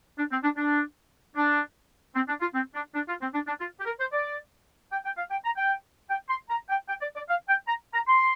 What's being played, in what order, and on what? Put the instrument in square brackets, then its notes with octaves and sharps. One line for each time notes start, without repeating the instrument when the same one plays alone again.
[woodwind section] D4
C4
D4
D4
D4
C4
D4
F4
C4
D4
D4
F4
C4
D4
D4
F4
G4
A#4
C5
D5
G5
G5
F5
G5
A#5
G5
G5
C6
A#5
G5
G5
D5
D5
F5
G5
A#5
A#5
C6